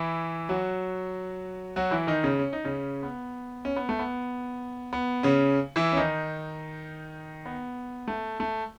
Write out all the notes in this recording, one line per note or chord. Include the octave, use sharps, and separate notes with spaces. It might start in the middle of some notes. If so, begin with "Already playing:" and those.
Already playing: E3 E4
F#3 F#4
F#3 F#4
E3 E4
D#3 D#4
C#3 C#4
C#4
D#4
C#3 C#4
B3
C#4
B3
A3
B3
B3
C#3 C#4
E3 E4
C#4
D#3 D#4
B3
A3
A3